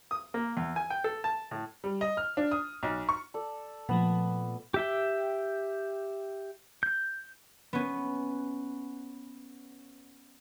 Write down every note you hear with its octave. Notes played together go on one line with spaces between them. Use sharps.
D#6
A#3
E2
G#5
G5
A4
A5
A2
G3
D#5
F6
D4
D#6
B1
C#6
A4 D5
A#2 F3 A3 B3
G4 E5 G5
G6
B3 C#4